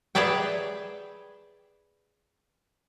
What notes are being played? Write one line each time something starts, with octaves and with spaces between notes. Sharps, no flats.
G#4 B4 C#5 D5 E5 G5